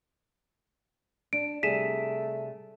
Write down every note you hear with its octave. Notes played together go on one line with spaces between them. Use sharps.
D4 D7
C3 G3 A3 G#4 B6 D#7 E7